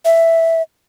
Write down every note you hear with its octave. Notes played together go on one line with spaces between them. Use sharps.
E5